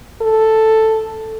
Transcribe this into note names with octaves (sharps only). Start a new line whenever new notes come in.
A4